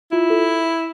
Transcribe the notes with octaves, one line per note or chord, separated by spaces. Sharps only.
E4 F4
A4